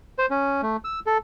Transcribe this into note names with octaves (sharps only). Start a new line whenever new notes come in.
C5
C#4
A3
E6
A4